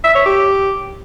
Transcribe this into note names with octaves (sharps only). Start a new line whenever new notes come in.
E5
C#5
G4